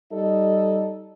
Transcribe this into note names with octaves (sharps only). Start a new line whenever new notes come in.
G3 D#4 A4 D#5